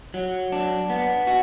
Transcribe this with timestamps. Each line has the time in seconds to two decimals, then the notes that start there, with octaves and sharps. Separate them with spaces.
0.14 F#3
0.52 D4
0.90 B3
1.27 F#4